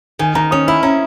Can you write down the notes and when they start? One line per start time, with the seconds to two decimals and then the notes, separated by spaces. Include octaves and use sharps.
0.19 D#3 G#5
0.35 D#3 A#5
0.51 C#4 D#6
0.68 E4 B5
0.83 C#4 A#5